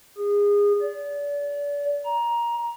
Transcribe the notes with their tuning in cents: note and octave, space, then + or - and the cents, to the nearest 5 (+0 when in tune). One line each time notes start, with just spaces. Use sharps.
G#4 -25
D5 -35
A#5 +15